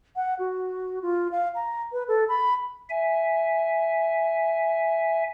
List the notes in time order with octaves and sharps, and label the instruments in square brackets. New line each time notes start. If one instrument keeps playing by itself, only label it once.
[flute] F#5
F#4
F4
F5
A#5
B4
A4
B5
[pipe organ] E5 G#5